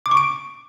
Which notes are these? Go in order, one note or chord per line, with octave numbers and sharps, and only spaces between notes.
D6
C#6
D7